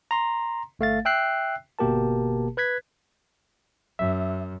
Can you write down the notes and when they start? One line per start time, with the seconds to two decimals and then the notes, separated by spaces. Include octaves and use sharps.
0.11 A#5 C6
0.79 G1 A3 F5 A6
1.05 E5 G5 E6 F#6 C7
1.79 G1 B2 A#3 G4 A#4 A5
2.57 B4 F#6 G#6 B6
3.99 F#2 E5